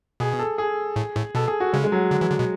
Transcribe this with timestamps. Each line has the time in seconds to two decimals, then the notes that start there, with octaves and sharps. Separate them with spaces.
0.20 B2 G#4
0.39 A4
0.58 G#4
0.96 A2
1.16 A2
1.35 B2 A4
1.48 G#4
1.60 F#4
1.73 C#3 G#3
1.84 G#3
1.92 F#3
2.11 D3
2.21 E3
2.30 D3
2.39 B2